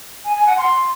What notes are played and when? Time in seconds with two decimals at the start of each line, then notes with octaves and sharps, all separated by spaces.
0.24 G#5
0.35 G#5
0.46 F#5
0.57 C6